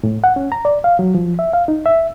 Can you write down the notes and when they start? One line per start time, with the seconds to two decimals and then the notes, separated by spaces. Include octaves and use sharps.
0.03 A2
0.24 F#5
0.36 C#4
0.52 A#5
0.65 D5
0.84 F5
0.99 F#3
1.15 F3
1.39 E5
1.53 F5
1.68 D#4
1.86 E5